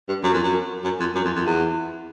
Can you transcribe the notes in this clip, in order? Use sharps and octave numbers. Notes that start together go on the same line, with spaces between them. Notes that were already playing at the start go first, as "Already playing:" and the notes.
G2
F#2
F2
F#2
F#2
F2
F#2
F2
F2
E2